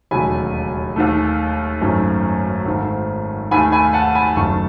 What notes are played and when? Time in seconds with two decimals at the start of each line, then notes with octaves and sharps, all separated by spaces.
0.11 E1 D#2 C#3 F#3 A3 G#5 B5
0.96 D#2 D#3 A3
1.81 G#1 F#2 D#3 A3
2.66 G#1 G#2 D#3 A3
3.51 D#2 D#3 A3 G#5 B5
3.72 G#5 B5
3.94 F#5 A5
4.15 G#5 B5
4.36 F#1 F#2 D#3 A3 A5 C#6